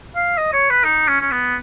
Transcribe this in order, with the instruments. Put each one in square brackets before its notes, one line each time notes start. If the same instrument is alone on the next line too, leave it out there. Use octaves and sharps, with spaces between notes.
[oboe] F5
D#5
C#5
B4
D#4
C#4
C#4
B3